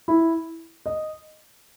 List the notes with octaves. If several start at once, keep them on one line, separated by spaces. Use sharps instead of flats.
E4
D#5